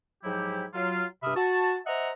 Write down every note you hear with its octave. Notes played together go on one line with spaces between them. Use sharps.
G#2 F3 F#3 E4 G4
F#3 F4
G2 C3 E5 B5 D#6 F6
F#4 A5
C5 D#5 E5 F#5 A#5